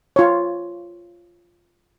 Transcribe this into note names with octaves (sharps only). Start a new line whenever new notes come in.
F4 C#5